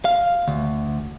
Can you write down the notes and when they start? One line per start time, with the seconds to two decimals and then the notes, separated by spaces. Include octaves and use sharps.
0.05 F5
0.48 D2